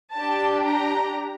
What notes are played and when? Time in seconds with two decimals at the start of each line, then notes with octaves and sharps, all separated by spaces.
0.14 D4 G4 A5
0.64 A#5